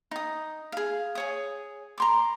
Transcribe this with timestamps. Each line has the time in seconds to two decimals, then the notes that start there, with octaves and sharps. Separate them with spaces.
0.11 D#4 D#6
0.72 G#4 F5
1.15 G#4 C#5 D#6
1.98 A#5 C6 D6